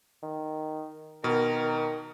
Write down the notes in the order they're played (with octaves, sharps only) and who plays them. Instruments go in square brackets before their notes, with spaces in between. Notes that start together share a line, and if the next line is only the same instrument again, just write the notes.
[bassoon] D#3
[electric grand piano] B2 [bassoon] D#3 [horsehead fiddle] A#4